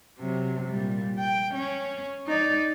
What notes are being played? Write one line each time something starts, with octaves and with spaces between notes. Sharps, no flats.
C3 F#3
A#2 G3
G5
C#4
D#4 D5